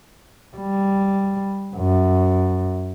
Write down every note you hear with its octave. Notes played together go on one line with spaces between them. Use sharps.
G3
F#2